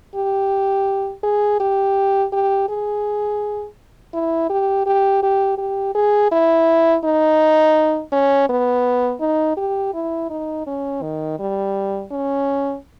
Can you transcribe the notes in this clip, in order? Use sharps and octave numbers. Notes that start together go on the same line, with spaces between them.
G4
G#4
G4
G4
G#4
E4
G4
G4
G4
G4
G#4
E4
D#4
C#4
B3
D#4
G4
E4
D#4
C#4
D#3
G3
C#4